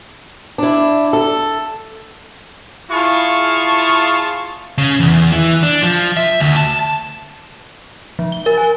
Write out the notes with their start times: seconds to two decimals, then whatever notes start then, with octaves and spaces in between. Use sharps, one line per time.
0.58 D4 E4
1.13 A4
2.90 E4 F4 G#4 F5 A5 C#6
4.78 C#3
5.00 E2
5.32 E3
5.63 D4
5.82 F3
6.17 E5
6.40 D2
6.57 A5
8.19 F3
8.32 G7
8.46 A#4
8.58 G#5